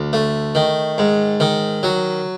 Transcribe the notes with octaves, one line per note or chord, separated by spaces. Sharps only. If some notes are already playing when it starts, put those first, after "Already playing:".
Already playing: D2
A3
D#3
G#2
D#3
F#3